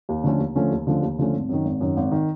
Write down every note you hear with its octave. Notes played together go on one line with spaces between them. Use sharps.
D#2
D3 F3 A3 C#4
D#2
D3 F3 A3 C#4
D#2
D3 F3 A3 C#4
D#2
D3 F3 A3 C#4
G#1
F#2 D#3
G#1
F#2 D#3
G#1
D#3